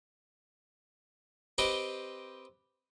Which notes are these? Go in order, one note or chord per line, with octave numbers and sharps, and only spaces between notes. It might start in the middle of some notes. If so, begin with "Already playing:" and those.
C4 G4 B4 C5 D#5 G5